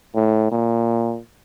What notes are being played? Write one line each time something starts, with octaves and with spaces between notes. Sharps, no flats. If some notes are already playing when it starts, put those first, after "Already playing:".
A2
A#2